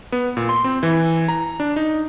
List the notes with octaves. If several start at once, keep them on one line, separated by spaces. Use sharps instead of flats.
B3
A#2
C6
C4
E3
A#5
D4
D#4